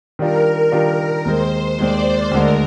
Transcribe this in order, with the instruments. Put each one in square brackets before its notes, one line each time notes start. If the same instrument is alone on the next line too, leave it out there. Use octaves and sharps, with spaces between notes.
[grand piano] D#3 G3 D4 F4 [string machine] A#4
[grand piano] D#3 G3 D4 F4
[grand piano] D#2 D#3 G#3 [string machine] C5
[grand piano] D#2 D#3 G#3 [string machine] D5
[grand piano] D2 D3 G#3 [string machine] A#4